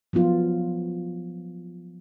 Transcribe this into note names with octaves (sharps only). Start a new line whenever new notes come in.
F3 F#3 B3 F4